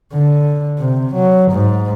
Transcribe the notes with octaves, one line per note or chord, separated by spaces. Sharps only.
D3
C3
F#3
G#2